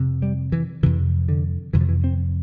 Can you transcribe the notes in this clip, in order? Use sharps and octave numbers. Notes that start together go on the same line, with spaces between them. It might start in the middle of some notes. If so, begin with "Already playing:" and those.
Already playing: F2 C3
G3
E3
F2 C3 E3
D3
F2 C3 E3
F3
E3
C4